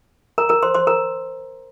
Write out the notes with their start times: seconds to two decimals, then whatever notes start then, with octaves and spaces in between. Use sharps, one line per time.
0.38 A#4 A#5
0.49 A#4 A#5
0.63 C5 C6
0.74 C5 C6
0.87 A#4 A#5